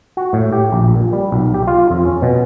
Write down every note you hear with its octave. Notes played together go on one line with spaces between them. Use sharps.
F#4
A2
G4
A#1
A#2
G3
B1
G4
F4
F2
C#4
B2